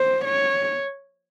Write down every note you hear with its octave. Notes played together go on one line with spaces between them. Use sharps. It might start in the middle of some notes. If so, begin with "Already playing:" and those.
Already playing: C5
C#5